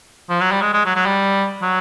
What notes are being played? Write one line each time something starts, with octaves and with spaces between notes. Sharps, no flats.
F3
F#3
G3
G#3
G#3
F#3
F#3
G3
F#3